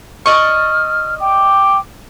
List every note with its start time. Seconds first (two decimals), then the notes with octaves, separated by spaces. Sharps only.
0.26 D5 D#5 C#6 F6
1.20 G5 D6